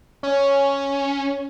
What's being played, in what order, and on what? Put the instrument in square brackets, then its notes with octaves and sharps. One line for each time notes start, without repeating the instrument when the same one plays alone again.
[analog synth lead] C#4